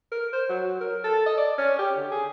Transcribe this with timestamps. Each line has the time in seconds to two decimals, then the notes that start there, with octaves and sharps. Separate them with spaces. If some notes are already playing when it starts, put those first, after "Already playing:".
0.12 A#4
0.33 C5
0.49 F#3
0.81 A#4
1.04 A4
1.26 D#5
1.38 D5
1.58 C#4
1.79 G4
1.97 D3
2.12 G#4